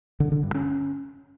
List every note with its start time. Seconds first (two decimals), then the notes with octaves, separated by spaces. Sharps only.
0.20 D3
0.32 D3
0.43 G2
0.55 C#4